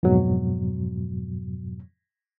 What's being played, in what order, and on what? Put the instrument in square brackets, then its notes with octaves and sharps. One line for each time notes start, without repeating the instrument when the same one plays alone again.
[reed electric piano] F2 G#2 B2 F#3